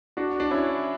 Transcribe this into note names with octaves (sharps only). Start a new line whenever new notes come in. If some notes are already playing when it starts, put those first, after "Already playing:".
D4 F#4
D4
C#4 E4